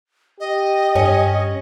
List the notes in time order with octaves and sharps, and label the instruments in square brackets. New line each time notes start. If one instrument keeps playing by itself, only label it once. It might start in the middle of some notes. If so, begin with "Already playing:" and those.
[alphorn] G4 [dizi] D#5
[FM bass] G2 [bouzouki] C#4